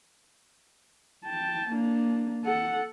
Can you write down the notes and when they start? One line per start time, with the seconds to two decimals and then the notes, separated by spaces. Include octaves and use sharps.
1.25 G5 A5
1.71 A#3 D4
2.44 A4 F#5